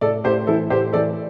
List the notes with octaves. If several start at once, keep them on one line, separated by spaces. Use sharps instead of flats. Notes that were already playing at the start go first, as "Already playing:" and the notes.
A2 A4 D5
A2 G4 C5
E3 E4 A4
A2 G4 C5
E3 A4 D5